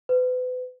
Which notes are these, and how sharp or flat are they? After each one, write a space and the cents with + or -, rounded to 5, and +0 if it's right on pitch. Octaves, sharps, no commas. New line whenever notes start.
B4 +35